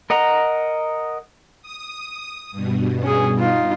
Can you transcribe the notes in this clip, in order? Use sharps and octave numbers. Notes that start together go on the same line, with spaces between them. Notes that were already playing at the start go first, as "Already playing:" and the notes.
A#4 D#5 F#5 A#5
D#6
G2 B2
C#4 G#4
D#4 F4